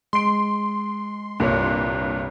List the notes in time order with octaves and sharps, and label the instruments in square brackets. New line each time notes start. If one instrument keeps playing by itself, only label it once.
[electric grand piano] G#3 D7 [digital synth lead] C6
[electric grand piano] C2 A#4 C#5 [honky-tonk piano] G2 A#2